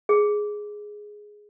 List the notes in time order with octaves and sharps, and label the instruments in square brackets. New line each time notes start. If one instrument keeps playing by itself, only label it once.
[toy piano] G#4